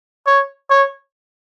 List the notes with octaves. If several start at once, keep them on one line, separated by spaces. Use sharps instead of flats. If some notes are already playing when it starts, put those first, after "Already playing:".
C#5
C#5